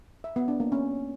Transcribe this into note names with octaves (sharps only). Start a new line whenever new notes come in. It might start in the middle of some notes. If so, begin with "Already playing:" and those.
E5
B3
D4
A#3
C#4